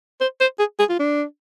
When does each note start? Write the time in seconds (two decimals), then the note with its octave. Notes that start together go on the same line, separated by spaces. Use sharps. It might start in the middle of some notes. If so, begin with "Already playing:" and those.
0.21 C5
0.40 C5
0.59 G#4
0.79 G#4
0.89 F4
0.99 D4